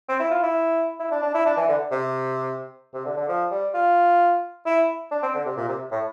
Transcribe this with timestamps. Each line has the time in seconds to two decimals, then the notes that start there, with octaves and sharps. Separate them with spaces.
0.09 C4
0.20 E4
0.31 F4
0.43 E4
1.00 E4
1.11 D4
1.23 D4
1.34 E4
1.46 D4
1.57 E3
1.69 D3
1.91 C3
2.94 C3
3.05 D3
3.17 D3
3.29 F3
3.51 G3
3.74 F4
4.66 E4
5.11 D4
5.23 C4
5.34 D3
5.46 C3
5.57 A#2
5.68 C3
5.91 A2